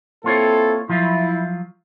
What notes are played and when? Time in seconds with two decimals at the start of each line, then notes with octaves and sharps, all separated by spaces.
0.24 A#3 C4 E4 F4 A4 C#5
0.89 F3 F#3 E4 F4